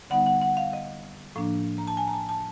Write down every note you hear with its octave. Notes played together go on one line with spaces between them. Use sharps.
D3 G3 B3 D#4 F#5
F#5
F#5
F5
D#5
A2 F3 A#3 D4
A#5
A5
G#5
A#5
A5
A5